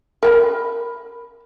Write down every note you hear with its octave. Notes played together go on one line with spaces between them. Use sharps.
A#4 G5 B5